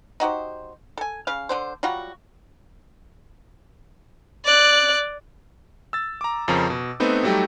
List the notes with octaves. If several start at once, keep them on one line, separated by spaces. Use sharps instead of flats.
D#4 F#4 G4 C5
A4 G#5
C#3 F5
D3 D4 C5
F#3 G3 F4 F#4
D5 F#6
E6 A6
A#5 D6
F2 C#3 F3 C#4 A#4 A#5
B2
A3 B3 C4 D#4 B4
F#3 G3 A3 D#4 G4